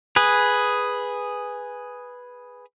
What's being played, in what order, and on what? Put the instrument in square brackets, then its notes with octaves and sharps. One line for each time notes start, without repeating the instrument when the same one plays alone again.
[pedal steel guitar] G#4 B4